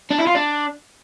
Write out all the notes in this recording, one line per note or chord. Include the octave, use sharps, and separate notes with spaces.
D4
E4
F4
D4